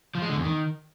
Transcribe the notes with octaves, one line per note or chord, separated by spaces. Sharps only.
F3
G#3
D3
E2
D#3